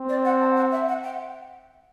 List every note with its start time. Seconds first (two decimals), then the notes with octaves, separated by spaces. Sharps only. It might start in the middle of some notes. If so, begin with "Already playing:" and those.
Already playing: C4
0.08 D5
0.24 F#5
0.40 A5
0.56 F#5
0.71 E5
0.88 F#5
1.03 G5